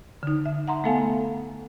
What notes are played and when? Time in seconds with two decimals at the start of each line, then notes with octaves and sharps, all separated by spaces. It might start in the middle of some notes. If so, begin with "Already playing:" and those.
0.23 D3 D#4
0.45 E5
0.68 F#5 A#5 C6
0.84 A3 B3 A4 F5 G#5